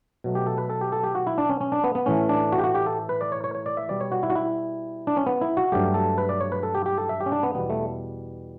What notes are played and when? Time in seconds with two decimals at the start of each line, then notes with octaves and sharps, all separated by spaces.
0.24 B2 F#3 A3
0.35 G4
0.47 A4
0.58 B4
0.70 A4
0.81 G4
0.92 A4
1.03 G4
1.15 F#4
1.27 E4
1.38 D4
1.49 C#4
1.61 C#4
1.72 D4
1.84 B3
1.95 B3
2.06 A2 E3 A3 C#4
2.29 D4
2.52 F#4
2.58 G4
2.64 F#4
2.75 G4
2.86 A4
3.09 B4
3.21 D5
3.32 C#5
3.44 C#5
3.55 C#5
3.66 D5
3.77 E5
3.89 B2 G3 D5
4.01 C#5
4.12 F#4
4.23 E4
4.30 F#4
4.35 E4
5.07 D4
5.17 C#4
5.26 B3
5.41 E4
5.57 F#4
5.72 G2 F#3 A3 G4
5.94 A4
6.18 B4
6.29 D5
6.41 C#5
6.52 B4
6.63 A4
6.75 G4
6.86 G4
6.98 A4
7.09 E5
7.20 G4
7.26 C#4
7.32 D4
7.43 B3
7.55 E2 B2 G3 B3
7.70 A3